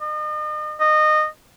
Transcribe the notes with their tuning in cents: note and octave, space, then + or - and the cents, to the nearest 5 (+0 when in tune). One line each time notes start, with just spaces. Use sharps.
D#5 -40
D#5 -20